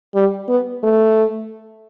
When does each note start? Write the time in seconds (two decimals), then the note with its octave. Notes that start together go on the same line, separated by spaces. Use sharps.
0.15 G3
0.49 B3
0.83 A3